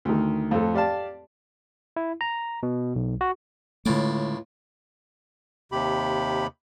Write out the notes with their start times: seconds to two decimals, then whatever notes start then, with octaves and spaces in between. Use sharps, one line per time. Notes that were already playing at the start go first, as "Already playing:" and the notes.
0.05 D2 D#3
0.51 F2 A2 A4
0.74 G4 D5 F5 A5
1.96 E4
2.21 A#5
2.63 B2
2.96 B1
3.21 F#4
3.86 C#2 A2 D3 G#3 A3 D6
5.72 D#2 C3 G4 B5